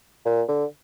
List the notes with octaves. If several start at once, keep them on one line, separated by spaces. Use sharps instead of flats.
A#2
D3